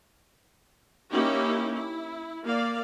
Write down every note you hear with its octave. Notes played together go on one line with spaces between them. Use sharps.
A#3 C#4 D#4 E4 G4
E4
A#3 D5 F5